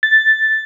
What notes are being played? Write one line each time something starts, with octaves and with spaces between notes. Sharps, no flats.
A6